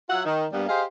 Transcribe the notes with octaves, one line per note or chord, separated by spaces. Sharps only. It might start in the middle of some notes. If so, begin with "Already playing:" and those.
F#3 F4 E5 F#5
D#3
G2 G3 A#3 B3
G4 G#4 C5 D#5 F5